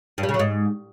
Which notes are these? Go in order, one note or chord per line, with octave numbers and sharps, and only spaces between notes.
G2
G3
C#3
F#3
G#2